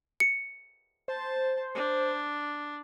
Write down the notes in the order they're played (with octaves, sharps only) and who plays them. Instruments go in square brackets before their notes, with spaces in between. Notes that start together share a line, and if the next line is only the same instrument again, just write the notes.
[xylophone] C#7
[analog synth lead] C5 [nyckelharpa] A5
[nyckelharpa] D4